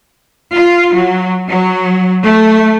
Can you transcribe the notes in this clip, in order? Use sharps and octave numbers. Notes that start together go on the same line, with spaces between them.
F4
F#3
F#3
A3